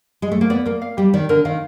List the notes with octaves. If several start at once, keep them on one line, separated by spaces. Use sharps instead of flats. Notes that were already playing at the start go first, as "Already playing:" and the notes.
G#3
A3
A#3
B3 D5
A#3 A#4
F5
G3 G4
D#3 D5
D3 A#4
D#3 F5